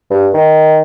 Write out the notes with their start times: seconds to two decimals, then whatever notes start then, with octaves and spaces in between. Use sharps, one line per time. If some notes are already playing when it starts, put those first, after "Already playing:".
0.10 G2
0.34 D#3